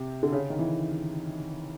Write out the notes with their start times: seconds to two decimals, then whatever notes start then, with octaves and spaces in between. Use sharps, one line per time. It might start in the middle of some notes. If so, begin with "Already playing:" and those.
Already playing: C3
0.23 D3
0.32 C#3
0.50 D#3
0.59 E3